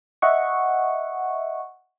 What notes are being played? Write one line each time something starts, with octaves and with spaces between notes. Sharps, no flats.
D#5 E5 F#5 C#6